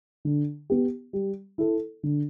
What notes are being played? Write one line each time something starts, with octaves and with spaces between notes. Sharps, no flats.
D3
B3 G4
G3
E4 A4
D3